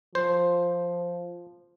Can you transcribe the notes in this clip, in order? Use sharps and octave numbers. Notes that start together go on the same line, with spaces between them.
F3 C5